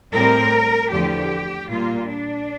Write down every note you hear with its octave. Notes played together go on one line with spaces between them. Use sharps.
A2 G3 C4 A#4
E2 D3 F3 A3 G4
A#2 G3 A#3 F4
D4